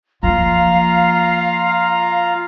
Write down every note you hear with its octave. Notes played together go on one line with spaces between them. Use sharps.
F3 A#3 F4 F5 A#5